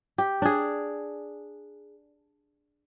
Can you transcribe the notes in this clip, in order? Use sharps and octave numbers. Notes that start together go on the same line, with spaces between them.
G4
D4 G#4